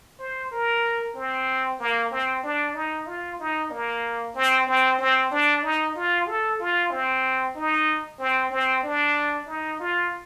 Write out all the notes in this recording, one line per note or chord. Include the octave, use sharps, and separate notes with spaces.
C5
A#4
C4
A#3
C4
D4
D#4
F4
D#4
A#3
C4
C4
C4
D4
D#4
F4
A4
F4
C4
D#4
C4
C4
D4
D#4
F4